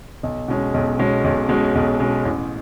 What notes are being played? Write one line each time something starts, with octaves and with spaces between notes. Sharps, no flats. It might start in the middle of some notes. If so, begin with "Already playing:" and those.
B1
B2 G#3 C#4
B1
B2 G#3 C#4
B1
B2 G#3 C#4
B1
B2 G#3 C#4
A1